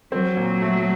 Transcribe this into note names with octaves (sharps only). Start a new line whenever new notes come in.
F#3 C4
A#2
A3